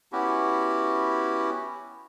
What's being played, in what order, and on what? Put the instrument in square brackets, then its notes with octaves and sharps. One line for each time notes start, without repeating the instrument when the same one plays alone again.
[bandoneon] B3 C#4 E4 F#4 G4